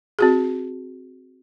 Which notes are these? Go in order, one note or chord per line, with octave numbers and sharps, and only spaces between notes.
C4 F#4 G#4